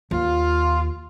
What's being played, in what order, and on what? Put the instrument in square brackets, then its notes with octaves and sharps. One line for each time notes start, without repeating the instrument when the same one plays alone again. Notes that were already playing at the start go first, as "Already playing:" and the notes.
[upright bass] D#2 [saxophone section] F4